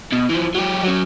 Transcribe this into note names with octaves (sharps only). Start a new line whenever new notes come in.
B2
E3 F3
F#3 G4
F#3 C#4